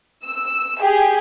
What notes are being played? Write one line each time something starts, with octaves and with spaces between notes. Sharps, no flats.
E6
G4 G#4